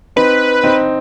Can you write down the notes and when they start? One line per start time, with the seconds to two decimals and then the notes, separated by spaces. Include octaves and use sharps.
0.16 C4 D#4 B4
0.64 C4 D#4